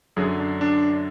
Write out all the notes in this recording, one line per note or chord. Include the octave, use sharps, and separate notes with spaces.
F#2 D3 F#3 G#4
D4
D4